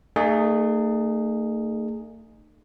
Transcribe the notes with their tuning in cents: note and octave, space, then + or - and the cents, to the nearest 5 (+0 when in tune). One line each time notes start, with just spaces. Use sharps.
A3 +40 D#4 -40 G#4 +0